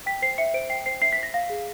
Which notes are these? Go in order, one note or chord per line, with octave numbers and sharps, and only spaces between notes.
G5 B6
C5 C7
E5 C#7
C5 D7
G5 C7
C5 C7
E5 C7
B6
C5
A#6
F5 A#6
G#4